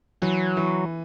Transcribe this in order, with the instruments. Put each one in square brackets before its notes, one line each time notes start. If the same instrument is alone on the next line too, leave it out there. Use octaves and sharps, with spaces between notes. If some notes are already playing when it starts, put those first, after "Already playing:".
[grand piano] E3 [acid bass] F#3
[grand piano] E3